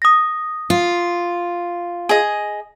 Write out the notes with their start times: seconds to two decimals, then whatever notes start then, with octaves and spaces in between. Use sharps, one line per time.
0.02 D#6 A#6
0.70 F4
2.09 G#4 D#5